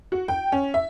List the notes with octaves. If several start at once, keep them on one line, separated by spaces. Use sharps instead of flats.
F#4
G5
C#4
E5